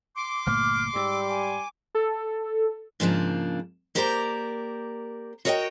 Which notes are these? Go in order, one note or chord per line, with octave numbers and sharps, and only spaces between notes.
C6 D6
G1 A#2 A3 F6
G#2 G3 E6
G#5
A4
G#2 C#3 F3 A#3 C4 D4
A#3 G4 A#4 C5 D5 A#5
F#4 A#4 C#5 D#5 F5 G5